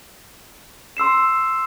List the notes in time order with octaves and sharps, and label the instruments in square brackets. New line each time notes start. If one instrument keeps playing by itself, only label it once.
[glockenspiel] C6 E6 C7 E7